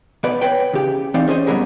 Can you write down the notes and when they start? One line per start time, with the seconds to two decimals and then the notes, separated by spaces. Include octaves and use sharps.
0.24 B2 B3 B4 D5
0.41 B4 C#5 G5
0.73 C#3 G4
1.14 E3 C4 D#4 D5 F5
1.27 C#4 G#4 C5 D#5
1.47 B2 E3 F#3 G3 G#4 A#4